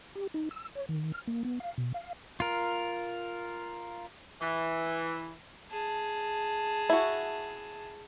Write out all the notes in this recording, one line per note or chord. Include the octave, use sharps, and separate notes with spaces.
G4
D#4
E6
C#5
D#3
F6
A#3
B3
F5
B2
F5
F4 A#4
E3
G#4 A5
E4 F#4